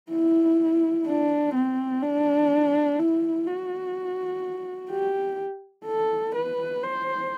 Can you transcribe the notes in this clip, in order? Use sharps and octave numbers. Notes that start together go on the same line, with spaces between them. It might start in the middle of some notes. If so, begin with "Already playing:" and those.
E4
D4
C4
D4
E4
F#4
G4
A4
B4
C5